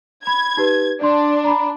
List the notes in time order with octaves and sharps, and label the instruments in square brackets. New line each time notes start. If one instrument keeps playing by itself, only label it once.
[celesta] B5 [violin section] G#6
[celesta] D#4 G4 B4
[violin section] D4 [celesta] D5 C6
[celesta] A#5 B5